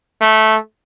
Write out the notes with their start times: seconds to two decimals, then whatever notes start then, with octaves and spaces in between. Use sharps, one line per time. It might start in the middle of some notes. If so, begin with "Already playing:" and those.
0.21 A3